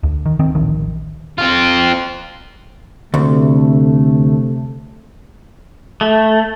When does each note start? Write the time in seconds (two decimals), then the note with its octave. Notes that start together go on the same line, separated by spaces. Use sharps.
0.03 D2
0.25 D#3
0.39 D#3 C4
0.55 D1 A#1 D#3
1.38 C4 F4
3.14 D2 C3 A3
6.01 A3